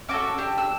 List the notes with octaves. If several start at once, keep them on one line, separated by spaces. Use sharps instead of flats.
C#4 F#4 A4 D6
D4 G4
E6